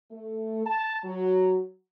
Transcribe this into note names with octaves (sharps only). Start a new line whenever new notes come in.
A3
A5
F#3